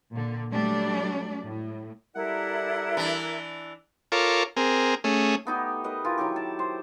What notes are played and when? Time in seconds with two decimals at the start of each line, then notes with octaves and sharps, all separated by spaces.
0.12 A#2 D3
0.51 F#3 G3 A3 D4 D5
1.45 A2
2.15 G3 E4 A4 A#4 D5 F#5
2.97 E3 D4
4.12 F4 A4 A#4 C#5 D6
4.57 C4 G#4 A#4
5.04 A3 C#4 G#4
5.45 A3 B3 D#4 G4
5.84 A#4 B4 D#5
6.04 E3 F4 A#4
6.18 D#3 F#3 E4 G4
6.36 A5
6.59 C5